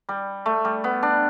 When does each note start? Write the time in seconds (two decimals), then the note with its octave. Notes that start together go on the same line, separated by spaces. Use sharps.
0.09 G3
0.46 A3
0.65 G3
0.84 B3
1.03 D4